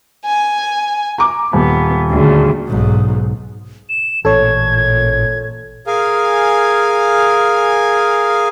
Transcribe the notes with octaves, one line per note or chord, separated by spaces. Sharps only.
G#5
A#5 D6
D#1 B3
D2 C#3
B1 G#2
E7
A1 A#2 A4 C#5 G#6
G#4 A#4 F5 G#5